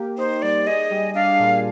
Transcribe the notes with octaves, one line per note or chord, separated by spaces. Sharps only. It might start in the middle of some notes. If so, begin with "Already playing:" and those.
Already playing: A#3 G4
D#4 C5
G3 D5
G#4 D#5
G3
D4 F5
A#2